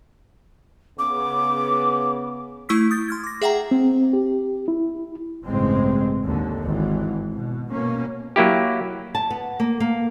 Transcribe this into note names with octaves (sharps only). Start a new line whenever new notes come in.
C#3 B3 D6
A3 E4 C#6 E6 B6
D#6 G6 A6
C6 F6 G#6
D6 A#6
G#4 E5 F#5 G5 A#5
C4
G4
E4
A1 G2 C#3 G#3 C4
D#2 D3
G#1 E3
B2
B2 A#3 C#4
F#3 A#3 E4 G4
A5
B3
A#3
A#3